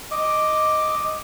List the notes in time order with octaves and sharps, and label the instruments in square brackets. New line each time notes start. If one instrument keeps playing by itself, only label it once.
[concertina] D#5 D6